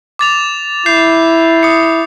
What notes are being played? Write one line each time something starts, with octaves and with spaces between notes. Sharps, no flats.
D6 A6 F7
E4 G6 C7 F7
D#6 C#7